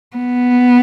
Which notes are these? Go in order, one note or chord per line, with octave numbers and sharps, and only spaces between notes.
B3